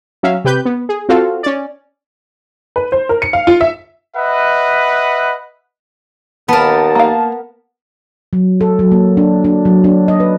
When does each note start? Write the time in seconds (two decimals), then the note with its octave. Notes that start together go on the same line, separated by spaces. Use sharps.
0.23 F#3 C#4 E5 F5
0.45 C3 G4 B4 G6
0.65 B3
0.89 G#4
1.09 C4 F4 F#4 A4 F5
1.43 C#4 D5
2.76 B4
2.92 C5
3.09 A#4
3.22 C#7
3.33 F5
3.47 F4
3.61 E5
4.16 B4 D#5 E5 F#5
6.49 D#2 B3 A#4 A5
6.95 A#3 F5
8.33 F#3
8.61 A4
8.79 F#3
8.92 A#3
9.17 D4
9.44 D4
9.65 F#3
9.84 D4
10.08 D#5
10.20 B4